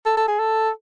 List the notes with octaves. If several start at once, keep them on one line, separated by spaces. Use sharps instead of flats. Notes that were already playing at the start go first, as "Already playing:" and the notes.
A4
A4
G#4
A4